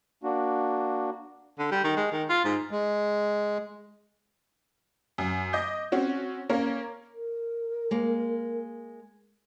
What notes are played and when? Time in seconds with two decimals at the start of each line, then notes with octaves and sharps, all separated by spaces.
0.24 A#3 D4 F#4
1.59 D3
1.71 G3
1.84 D#3
1.96 G#3
2.12 D#3
2.29 F4
2.44 G#2
2.71 G#3
5.18 F#2
5.53 D#5 D6 G6
5.92 C4 C#4 F#4
6.49 A#3 C#4 A#4
7.15 A#4
7.91 G#3 A#3